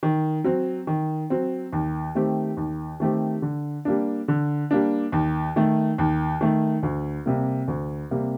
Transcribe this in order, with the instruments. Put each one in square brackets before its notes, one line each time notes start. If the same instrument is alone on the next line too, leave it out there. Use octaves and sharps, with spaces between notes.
[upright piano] D#3
F#3 C4
D#3
F#3 C4
D#2
D#3 A3 C4 G4
D#2
D#3 A3 C4 G4
D3
G3 A#3 D4
D3
G3 A#3 D4
D#2
D#3 A3
D#2
D#3 A3
D2
C3 G3 A#3
D2
C3 G3 A#3